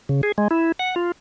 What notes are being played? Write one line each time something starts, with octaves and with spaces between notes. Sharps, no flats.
C#3
G#4
G#3
E4
F#5
F4